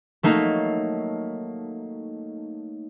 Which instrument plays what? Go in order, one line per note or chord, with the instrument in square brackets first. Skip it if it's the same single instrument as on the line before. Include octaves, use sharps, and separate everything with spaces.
[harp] F#3 A3 A#3 D#4